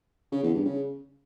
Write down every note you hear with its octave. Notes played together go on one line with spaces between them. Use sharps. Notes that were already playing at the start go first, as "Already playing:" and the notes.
C#3
E2
G2
C#3